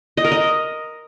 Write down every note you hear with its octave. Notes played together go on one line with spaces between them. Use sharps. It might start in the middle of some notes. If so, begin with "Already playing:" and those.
D#5
A#4
D#5